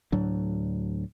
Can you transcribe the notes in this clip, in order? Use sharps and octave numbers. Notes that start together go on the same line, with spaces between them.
D2 A2 F#3 D4